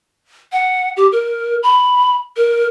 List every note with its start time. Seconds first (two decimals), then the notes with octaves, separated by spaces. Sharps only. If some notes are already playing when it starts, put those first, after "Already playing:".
0.52 F#5
0.97 G4
1.12 A#4
1.63 B5
2.37 A#4